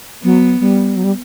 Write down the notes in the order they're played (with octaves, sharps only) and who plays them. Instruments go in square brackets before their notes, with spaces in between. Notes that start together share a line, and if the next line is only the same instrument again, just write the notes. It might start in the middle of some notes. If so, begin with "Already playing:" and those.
[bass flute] F#3 [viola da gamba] B3
[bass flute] G3
F#3
G3